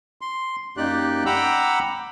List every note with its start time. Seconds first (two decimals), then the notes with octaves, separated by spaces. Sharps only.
0.21 C6
0.77 F#2 A#3 D#4 G4 D5 F#6
1.26 F#5 G5 A#5 B5 D6 E6